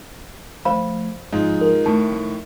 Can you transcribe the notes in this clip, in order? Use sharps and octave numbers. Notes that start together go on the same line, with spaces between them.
F3 A3 C5 F5 B5
G#2 F3 G#3 D#4 F4
A#4
A2 D#3 A3 A5
F3